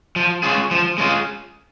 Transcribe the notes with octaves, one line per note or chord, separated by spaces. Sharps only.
F3
G#3 C#4 F4 G#4
F3
G#3 C#4 F4 G#4